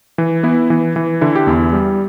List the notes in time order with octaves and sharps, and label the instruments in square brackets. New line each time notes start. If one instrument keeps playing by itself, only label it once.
[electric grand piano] E3
B3 E4
E3
E3
D3 E4
G4
E2 E4
G3